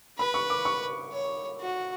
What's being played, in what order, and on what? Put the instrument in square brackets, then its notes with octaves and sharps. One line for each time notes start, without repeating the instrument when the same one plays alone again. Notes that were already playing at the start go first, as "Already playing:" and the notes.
[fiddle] B4 [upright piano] B5
[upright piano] C#6
D6
C#6
[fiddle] C#5
F#4